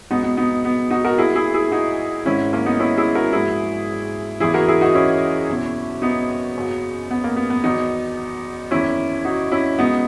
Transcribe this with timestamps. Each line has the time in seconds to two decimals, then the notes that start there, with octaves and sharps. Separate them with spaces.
0.11 C#2 B2 F#3 B3 D#4
0.23 B3
0.37 B3 D#4
0.65 B3
0.90 D#4 F#4
1.05 F#4 A#4
1.17 B1 A#2 F#3 E4 G#4
1.35 E4 G#4
1.54 E4 G#4
1.71 D#4 F#4
2.25 G#1 G#2 D#3 C#4 E4
2.53 A#3 C#4
2.66 B3 D#4
2.79 C#4 E4
2.97 E4 G#4
3.15 F#4 A#4
3.33 A#1 G#2 F#3 E4 G#4
4.40 F#1 E2 C#3 E3 E4 G#4
4.54 F#4 A#4
4.68 E4 G#4
4.81 D#4 F#4
4.95 C#4 E4
5.49 F#1 E2 B2 F#3
6.02 B3 D#4
6.57 F#1 F#2 C#3 F#3
7.11 B3
7.24 A#3
7.36 B3
7.50 B3
7.64 E2 D#3 F#3 B3 D#4
8.71 F#1 E2 D#3 C#4 E4
9.25 D#4 F#4
9.52 C#4 E4
9.79 C#2 C#3 F#3 B3 D#4